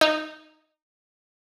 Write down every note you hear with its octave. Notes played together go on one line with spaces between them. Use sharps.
D#4